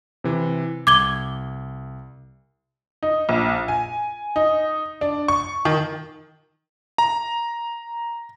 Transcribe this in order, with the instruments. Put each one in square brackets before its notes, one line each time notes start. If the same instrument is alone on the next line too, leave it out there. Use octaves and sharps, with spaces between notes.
[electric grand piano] C3 E3
[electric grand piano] C2 [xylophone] D6 G#6 G7
[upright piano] D#4
A#1
G#5
D#4
D4
C#6
D#3
[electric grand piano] A#5